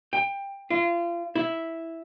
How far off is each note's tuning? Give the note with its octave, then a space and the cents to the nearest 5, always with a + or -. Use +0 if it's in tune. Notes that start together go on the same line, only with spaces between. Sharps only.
G5 +20
F4 -30
E4 -5